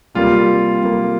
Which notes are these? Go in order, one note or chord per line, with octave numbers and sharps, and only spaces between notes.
C3 G3 A#3 F4
C3 G3 A#3